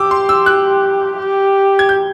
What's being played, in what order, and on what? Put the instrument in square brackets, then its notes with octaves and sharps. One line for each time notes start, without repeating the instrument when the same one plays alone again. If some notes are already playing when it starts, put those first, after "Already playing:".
Already playing: [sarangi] G4 [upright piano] D6 E6
[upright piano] C6
E6
F#6
[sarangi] G4
[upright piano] G#6
G6